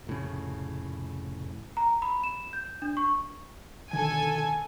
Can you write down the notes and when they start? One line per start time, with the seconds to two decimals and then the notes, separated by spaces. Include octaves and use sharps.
0.07 F1 A2 C#3
1.77 A#5
2.02 B5
2.24 E7
2.53 G6
2.82 D4
2.97 C#6
3.93 B2 D3 D#3 A4 G#5